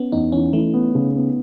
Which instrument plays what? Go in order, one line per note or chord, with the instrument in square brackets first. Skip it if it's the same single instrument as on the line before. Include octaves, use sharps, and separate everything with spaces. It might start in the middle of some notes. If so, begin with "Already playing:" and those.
Already playing: [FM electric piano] B3 C#4
[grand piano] E2 [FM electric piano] D#4
[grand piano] E3 [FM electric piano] C#4
[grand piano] E3 [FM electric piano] A3
[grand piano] B3
C#3
B3